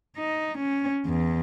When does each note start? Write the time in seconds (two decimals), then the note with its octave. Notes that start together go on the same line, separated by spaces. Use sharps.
0.17 D#4
0.59 C#4
1.06 E2